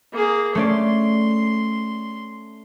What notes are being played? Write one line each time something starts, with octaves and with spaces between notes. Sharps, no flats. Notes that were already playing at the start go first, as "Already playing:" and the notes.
A#3 G#4
A3 C#4 D5 C6